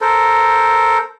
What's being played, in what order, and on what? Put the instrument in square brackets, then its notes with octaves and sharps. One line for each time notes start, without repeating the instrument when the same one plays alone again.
[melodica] A4 A#4 C5